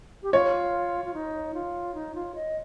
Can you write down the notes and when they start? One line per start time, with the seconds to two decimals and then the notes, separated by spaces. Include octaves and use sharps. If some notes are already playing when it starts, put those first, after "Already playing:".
0.23 G4
0.33 F4 C#5
1.05 F4
1.14 D#4
1.54 F4
1.95 D#4
2.15 F4
2.35 D#5